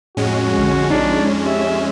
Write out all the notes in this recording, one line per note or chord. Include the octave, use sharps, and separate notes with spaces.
F2 A2 G#3 C#4 F#4
B1 D3
D4 D#4 F4
G4 E5